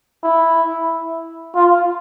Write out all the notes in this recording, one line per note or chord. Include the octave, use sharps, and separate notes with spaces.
E4
F4